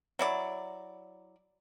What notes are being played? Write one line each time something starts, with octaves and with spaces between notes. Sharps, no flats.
F#3 E4 D5